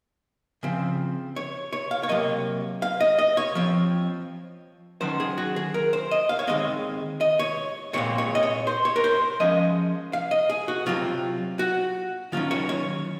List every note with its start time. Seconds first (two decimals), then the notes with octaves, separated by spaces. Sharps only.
0.63 C#3 F3 C4
1.36 C#5
1.73 C#5
1.91 F5
2.03 C#5
2.09 C3 F#3 A#3 D#5
2.82 F5
3.00 D#5
3.18 D#5
3.37 C#5
3.55 F3 C4
5.01 D#3 F#3 C#4 C5
5.20 G#4
5.38 F#4
5.56 G#4
5.74 A#4
5.93 C5
6.11 D#5
6.29 F5
6.39 C#5
6.47 D#3 G#3 C4 D#5
7.21 D#5
7.39 C#5
7.93 A#2 G#3 C4 C#5
8.18 C#5
8.35 D#5
8.43 C#5
8.67 C5
8.85 C#5
8.96 A#4
9.04 C5
9.40 F3 G#3 C#4 D#5
10.13 F5
10.31 D#5
10.50 G#4
10.68 F#4
10.86 C3 F#3 C4 F4
11.59 F#4
12.32 D#3 F#3 C#4 F4
12.51 C#5
12.69 C#5